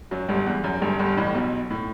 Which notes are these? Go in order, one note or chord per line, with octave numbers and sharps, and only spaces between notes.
F#2 F#3
G1 G2
E2
F#2
G1 G2
G1 G2
A1 A2
B1 B2
A2